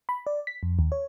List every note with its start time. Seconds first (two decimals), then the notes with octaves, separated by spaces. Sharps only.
0.09 B5
0.27 D5
0.47 B6
0.63 F2
0.79 D#2
0.92 C#5